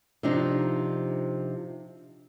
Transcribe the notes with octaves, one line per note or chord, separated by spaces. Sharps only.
C3 F3 D4 D#4